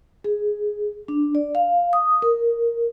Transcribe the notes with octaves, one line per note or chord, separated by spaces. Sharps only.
G#4
D4
D5
F5
D#6
A#4